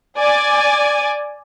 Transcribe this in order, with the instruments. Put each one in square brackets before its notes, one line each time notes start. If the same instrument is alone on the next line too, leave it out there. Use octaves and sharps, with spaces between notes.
[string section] D5 G#5